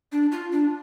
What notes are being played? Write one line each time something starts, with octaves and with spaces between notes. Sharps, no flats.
D4
F4
D4